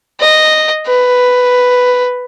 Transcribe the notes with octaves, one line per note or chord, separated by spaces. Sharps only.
D#5
B4